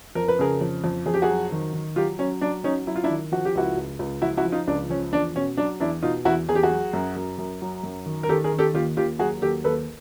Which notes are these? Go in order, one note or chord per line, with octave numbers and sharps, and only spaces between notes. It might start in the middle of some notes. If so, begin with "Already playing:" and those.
F2 A#4
B4
C#3 G#4 A#4
F2
F2
F2 G#4
G4
F#4 G#4
F#3
D#3
D#3
F#3 F4 G4
F#3 C#4
F#3 D4
F#3 C#4 D#4
F#3 E4
F4
D4 E4
D#3
F3 F#4
G4
C#2 E4 F#4
C#2
C#2
F3 E4 F#4
E4 F#4
F3
D#4 F4
C#2 D4
F3 C#4
E2 D4
B2 C#4
F#3 D4
E2 D4 E4
B2 D#4 F4
E2 E4 F#4
E2 G#4
G4
F#4 G#4
F#3
F#2
F#2
F#2
F#3
F#2
D#3
A#4
D#3 G4 A4
G#4 A#4
D#3
G4 A4
D#2 F4 G4
D#2 F4 G4
F#3 F#4 G#4
D#2 G4 A4
D#2 A4 B4